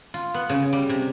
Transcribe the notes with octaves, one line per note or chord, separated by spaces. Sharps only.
F4
B3
C#3
G3
C3